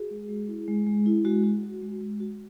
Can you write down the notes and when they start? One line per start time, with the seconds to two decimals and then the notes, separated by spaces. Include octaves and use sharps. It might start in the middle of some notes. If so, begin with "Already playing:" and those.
Already playing: F#4 G#4
0.11 G#3
0.29 G#3
0.48 E4
0.68 G#3
0.87 G#3
1.06 E4
1.25 G#3 F#4
1.43 F#4
1.63 F#4
1.82 G#3
2.01 G#3
2.20 F#4